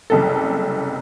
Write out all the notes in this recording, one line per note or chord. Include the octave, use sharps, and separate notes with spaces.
F#1 C2 A4